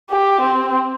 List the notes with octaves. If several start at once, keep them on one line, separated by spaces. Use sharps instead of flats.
G4
C4